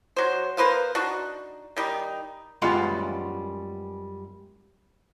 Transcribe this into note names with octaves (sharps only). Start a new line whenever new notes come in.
F#3 C5
A#3 B4 C5 F5
D4 D#4 F#4
D#3 G3 D#4
F#2 G3 G#3 B3 F4 F5